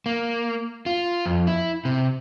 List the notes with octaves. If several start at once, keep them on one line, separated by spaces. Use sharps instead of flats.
A#3
F4
F2
E4
C3